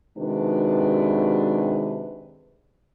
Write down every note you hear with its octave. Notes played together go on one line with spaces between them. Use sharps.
C3 D#3 G#3 D4 F#4 B4